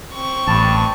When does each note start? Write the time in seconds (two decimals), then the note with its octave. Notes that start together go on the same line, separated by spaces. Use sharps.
0.14 C4 C#6
0.47 A1 G2 A5